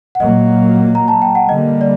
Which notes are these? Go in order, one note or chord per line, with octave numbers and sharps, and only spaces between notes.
F#5
A#2 F#3 A#3 D#5
A#5
A5
G5
F#5
D3 G3 A#3 D#5
D5